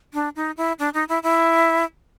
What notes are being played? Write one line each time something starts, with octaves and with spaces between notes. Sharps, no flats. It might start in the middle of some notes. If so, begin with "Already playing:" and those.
D4
D#4
E4
D4
D#4
E4
E4